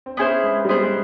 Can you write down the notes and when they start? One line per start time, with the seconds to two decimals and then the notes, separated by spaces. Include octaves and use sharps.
0.06 C4
0.17 B3 C#4 E4 G#4 C5
0.44 G#3
0.65 G3
0.69 G#3 B3 E4 G#4 C5
0.83 G#3